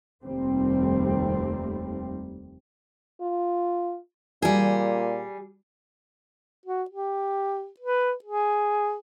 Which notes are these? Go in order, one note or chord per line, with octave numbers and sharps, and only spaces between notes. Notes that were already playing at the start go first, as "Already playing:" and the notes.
F1 D#2 G3 A3 C4
F4
A#2 G3 G#4
F#4
G4
B4
G#4